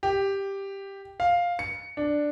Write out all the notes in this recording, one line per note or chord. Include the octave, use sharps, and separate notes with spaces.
G4
F5
C#7
D4